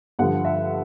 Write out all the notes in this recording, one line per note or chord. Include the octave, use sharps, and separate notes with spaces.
G2 D3 F3 F#5
E5